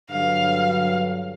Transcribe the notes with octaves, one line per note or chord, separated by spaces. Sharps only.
G2 D3 F#3 F5